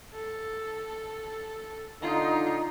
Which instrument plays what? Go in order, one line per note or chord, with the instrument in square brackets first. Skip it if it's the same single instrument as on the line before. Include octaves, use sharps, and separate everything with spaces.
[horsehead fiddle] A4
[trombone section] D3 D#4 [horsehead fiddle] F4